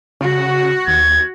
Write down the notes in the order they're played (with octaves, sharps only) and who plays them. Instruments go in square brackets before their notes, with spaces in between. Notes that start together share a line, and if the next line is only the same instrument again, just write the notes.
[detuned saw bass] C#3 [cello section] F#4
[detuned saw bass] D#2 [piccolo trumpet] G#6